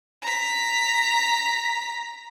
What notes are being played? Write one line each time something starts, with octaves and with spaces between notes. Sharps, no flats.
A#5 B6